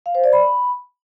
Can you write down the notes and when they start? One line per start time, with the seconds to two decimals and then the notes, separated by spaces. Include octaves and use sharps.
0.06 F5
0.15 C5
0.24 D5
0.33 B5